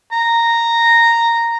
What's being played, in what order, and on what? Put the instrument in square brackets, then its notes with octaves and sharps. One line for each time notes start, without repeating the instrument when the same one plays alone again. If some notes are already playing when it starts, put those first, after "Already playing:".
[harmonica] A#5